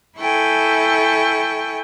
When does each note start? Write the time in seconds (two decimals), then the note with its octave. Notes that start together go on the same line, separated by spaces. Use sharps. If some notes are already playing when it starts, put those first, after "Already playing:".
0.19 E4 A4 G5 G#5 C#6